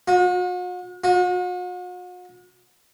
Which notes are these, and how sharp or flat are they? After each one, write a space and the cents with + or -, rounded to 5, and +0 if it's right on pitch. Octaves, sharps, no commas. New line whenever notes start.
F#4 -45
F#4 -45